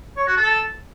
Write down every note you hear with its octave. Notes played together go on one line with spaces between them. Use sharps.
C#5
F#4
A4